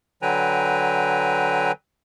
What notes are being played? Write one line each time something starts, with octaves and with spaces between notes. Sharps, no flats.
D3 F#3 B4 G5 G#5 A#5